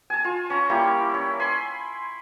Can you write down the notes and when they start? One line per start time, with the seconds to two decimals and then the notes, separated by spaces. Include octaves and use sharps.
0.10 G#5 A5
0.24 F4
0.50 C#4 A#5
0.69 G3 A#3 E4
1.14 C#4
1.40 G#5 B5 C6